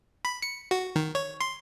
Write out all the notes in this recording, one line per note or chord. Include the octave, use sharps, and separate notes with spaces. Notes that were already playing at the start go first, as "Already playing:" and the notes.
B5
C#7
F#4
D#3
C#5
C6